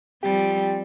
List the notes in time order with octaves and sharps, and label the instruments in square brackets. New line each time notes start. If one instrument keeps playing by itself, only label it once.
[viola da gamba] F3 G3 C4 [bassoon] G4